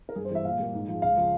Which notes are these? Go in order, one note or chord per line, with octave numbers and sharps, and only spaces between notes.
A#4
G2 G#4
C5
E3 G3 E5
A#2 F5
G3 A#3
G#2
F3 G#3
C#2 F5
C#3 F3